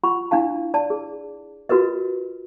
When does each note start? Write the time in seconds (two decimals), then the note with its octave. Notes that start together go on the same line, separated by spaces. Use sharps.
0.03 F4 F#5 B5 C#6
0.31 D4 E4 F5 A5
0.74 D5 A5
0.90 G#4
1.69 F4 F#4 A#4 B4 D#5